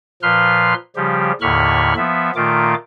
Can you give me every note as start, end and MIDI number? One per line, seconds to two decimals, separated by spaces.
0.22 0.74 46
0.22 0.74 53
0.22 0.74 71
0.22 0.74 84
0.22 0.74 89
0.96 1.32 49
0.96 1.32 53
0.96 1.32 55
0.96 1.32 67
1.41 1.94 39
1.41 1.94 45
1.41 1.94 50
1.41 1.94 83
1.41 1.94 85
1.41 1.94 89
1.97 2.31 53
1.97 2.31 59
1.97 2.31 76
2.35 2.74 46
2.35 2.74 51
2.35 2.74 57
2.35 2.74 65
2.35 2.74 86